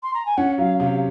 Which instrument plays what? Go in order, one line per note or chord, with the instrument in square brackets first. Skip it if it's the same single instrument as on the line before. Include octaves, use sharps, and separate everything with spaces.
[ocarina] C6
A#5
G#5
[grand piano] C#4 [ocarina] F#5
[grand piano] F#3 [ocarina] F5
[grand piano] C3 [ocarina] F5